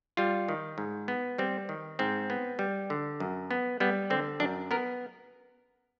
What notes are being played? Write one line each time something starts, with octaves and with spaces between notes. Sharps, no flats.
G3 F4
D#3
G#2
B3
G3 C4
D#3
G#2 C4
B3
G3
D3
F#2
B3
G3 B3
D3 C4
F#2 D4
B3 A#4